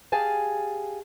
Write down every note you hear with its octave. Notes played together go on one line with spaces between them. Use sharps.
G4 G#4 F5 G#5 A5